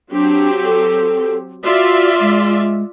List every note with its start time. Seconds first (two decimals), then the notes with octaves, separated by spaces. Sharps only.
0.12 F#3 C4 D4 G4
0.65 A4
1.63 F4 F#4 D5 E5
2.20 G#3